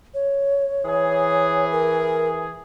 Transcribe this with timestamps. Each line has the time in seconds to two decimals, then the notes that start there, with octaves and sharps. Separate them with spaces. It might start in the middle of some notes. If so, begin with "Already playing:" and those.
0.14 C#5
0.85 E3 G#4
1.72 A#4